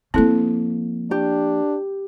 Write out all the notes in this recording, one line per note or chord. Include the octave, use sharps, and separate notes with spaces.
F3 A#3 C4 E4 A4
D4 G4